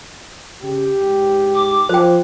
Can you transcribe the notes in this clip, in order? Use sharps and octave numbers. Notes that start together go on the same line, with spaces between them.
C#3 G4
G#2
D6
F3 C5 G5